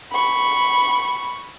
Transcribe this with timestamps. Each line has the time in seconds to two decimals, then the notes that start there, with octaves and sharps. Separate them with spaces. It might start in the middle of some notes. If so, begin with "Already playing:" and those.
0.13 B5 C#6